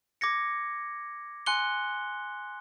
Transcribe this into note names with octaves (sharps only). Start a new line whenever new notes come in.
D6 G#6 A#6 C#7
G#5 C6 F#6 C#7 G7